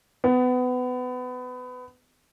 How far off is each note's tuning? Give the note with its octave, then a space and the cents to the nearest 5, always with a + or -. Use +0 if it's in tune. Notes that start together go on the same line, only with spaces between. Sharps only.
B3 +25